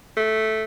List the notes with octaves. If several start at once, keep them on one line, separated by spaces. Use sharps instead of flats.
A3